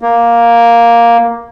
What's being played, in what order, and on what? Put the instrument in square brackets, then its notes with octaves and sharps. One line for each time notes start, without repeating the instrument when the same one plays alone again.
[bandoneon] A#3